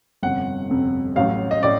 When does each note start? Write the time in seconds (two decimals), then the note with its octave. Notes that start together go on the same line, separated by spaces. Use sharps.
0.23 G1 F2 C3 F#5
0.70 G1 F2 C3
1.16 A1 A2 F#3 F5
1.51 D#5
1.63 A2 D5